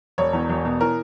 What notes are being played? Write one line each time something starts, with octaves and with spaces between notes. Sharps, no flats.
E1 C#5
E2
E1
B2
E3 A#4